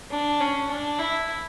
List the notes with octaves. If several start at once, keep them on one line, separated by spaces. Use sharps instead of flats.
D4
C#4
D4
E4